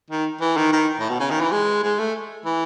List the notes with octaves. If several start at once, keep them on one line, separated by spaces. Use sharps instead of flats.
D#3
E3
D#3
D#3
A2
B2
C#3
D#3
E3
G#3
G#3
A3
E3